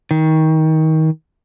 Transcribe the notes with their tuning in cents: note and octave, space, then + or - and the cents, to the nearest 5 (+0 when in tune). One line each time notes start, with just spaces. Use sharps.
D#3 +25